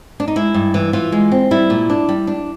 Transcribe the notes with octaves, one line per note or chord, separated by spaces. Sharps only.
D4
D#4
G#3 E4
G2
E3
E3 F4
G#3
C4
G3 E4
A#2
D4
G3
D4